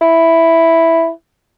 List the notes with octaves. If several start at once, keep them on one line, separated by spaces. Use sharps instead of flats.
E4